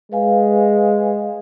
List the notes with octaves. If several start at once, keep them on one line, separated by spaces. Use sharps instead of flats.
G#3 B4 F5 G#5